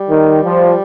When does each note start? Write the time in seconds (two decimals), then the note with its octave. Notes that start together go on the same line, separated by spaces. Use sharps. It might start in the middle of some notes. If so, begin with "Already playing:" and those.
Already playing: G3
0.09 D#3
0.43 F3